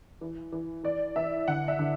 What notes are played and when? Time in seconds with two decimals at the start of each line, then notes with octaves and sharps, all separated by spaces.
0.21 E3
0.52 E3
0.83 E3 D5
1.16 E3 E5
1.48 D3 F#5
1.68 E5
1.79 D3